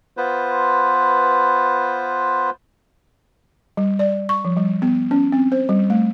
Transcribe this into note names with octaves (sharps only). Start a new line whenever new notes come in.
B3 F4 B4 C5
G3
D5
C#6
F3
G3
B3
C#4
C4
C5
G3
A3